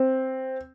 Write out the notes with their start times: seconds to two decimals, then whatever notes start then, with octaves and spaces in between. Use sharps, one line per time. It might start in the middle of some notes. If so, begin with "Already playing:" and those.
Already playing: C4